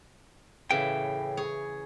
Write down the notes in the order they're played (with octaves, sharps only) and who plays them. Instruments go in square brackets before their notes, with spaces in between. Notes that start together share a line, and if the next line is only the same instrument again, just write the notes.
[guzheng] A2 C#3 E3 [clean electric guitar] G5
[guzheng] G#4 C#5